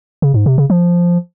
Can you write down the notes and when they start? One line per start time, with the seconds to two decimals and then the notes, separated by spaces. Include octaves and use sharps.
0.22 C#3
0.34 G#2
0.46 C3
0.58 C#3
0.70 F3